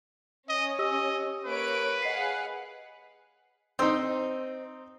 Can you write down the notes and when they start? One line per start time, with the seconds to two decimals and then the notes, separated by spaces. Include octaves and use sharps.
0.49 C#4 D#5
0.79 G4 D#5 E6
1.45 A#3 B4 C#5 D7
2.02 G#4 D#5 F5 F#5 C7
3.79 C4 D#4 C5 D#5 E6